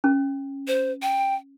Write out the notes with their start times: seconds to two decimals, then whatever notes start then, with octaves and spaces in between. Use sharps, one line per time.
0.04 C#4
0.67 C5
1.02 G5